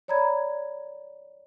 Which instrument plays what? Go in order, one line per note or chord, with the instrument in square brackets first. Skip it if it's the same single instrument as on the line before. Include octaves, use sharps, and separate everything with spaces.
[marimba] C#5 D5 A#5 B5 G#6